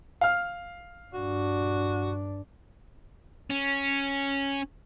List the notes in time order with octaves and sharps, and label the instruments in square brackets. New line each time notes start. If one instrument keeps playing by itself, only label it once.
[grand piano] F5 F6
[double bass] G2 D4 [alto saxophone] F#4
[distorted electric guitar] C#4